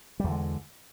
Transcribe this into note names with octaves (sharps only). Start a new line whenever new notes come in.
E2 D3 G3 G#3